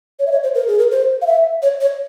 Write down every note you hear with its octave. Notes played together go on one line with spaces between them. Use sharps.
C#5
E5
C#5
C5
A#4
G#4
A#4
C5
F5
E5
C#5
C#5